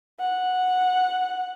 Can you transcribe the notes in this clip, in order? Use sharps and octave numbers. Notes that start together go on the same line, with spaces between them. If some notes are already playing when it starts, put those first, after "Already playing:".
F#5